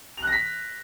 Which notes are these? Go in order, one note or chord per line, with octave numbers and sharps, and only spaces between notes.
F#6 A#6 B6 F7